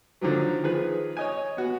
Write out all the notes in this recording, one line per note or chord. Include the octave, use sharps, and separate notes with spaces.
D3 D#3 F3 F#3
D#3 F3 G#4 B4
C#5 D#5 G#5
B3 F#4